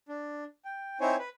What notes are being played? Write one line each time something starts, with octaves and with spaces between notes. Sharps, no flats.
D4
G5
C4 D#4 E4 C5 C#5 G#5
B4